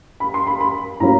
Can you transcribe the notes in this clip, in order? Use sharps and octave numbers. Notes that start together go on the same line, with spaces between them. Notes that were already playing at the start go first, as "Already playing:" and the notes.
B5
C6
B5
B5
A2 F#3 A#3 C#4 A#5